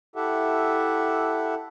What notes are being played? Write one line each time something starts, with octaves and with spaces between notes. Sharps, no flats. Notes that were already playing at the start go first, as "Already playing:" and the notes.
E4 G4 A4 E5 F#5